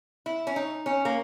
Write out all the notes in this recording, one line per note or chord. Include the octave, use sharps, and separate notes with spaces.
E4
C#4
D#4
C#4
A#3